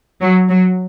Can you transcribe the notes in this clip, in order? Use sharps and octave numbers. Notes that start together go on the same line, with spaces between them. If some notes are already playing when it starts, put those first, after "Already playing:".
F#3
F#3